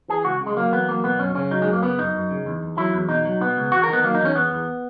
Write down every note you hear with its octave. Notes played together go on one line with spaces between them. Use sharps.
E3 G#4
C#2 F#4
C#3
G#3
F#3 A#3
E2 B3
F#3 A#3
B2 B3
F#2 C#4
C#3 C#4
F#3 D#4
G#3
F#2
A#3
C#3 B3
F#2 D#4
F#2
C#3
E2
E2
F#3 E4
E2
B2 D#4
F#3
B2 B3
C#2
E2 F#4
A#4
D#3 B3
F#3 A#3
E2 D#4
C#4
E2 B3
E2